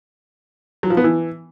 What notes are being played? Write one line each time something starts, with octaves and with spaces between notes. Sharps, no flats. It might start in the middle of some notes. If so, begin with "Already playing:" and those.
F#3
F3
B3
E3